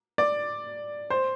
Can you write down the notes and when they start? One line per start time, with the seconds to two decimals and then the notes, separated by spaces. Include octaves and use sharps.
0.18 D5
1.10 C5